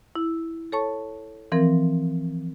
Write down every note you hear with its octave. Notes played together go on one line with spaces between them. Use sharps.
E4
A4 C#5 A5 C#6
E3 F3 C4 A#4